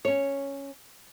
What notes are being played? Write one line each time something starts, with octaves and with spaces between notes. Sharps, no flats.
C#4 C#5